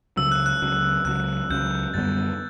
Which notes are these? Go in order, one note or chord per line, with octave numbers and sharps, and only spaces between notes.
C#2 C#3 F#3 E6
F#6
F#6
C#2 C#3 F#3
C#2 C#3 F#3 F#6
C#2 C#3 F#3 G6
F#2 D3 G3 B3 A6